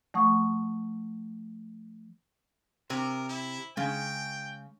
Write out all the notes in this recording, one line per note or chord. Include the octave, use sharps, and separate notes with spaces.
F3 A3 F#5 C#6 D#6
C3 A#4 C5
E4
C#3 G#3 G5 G#5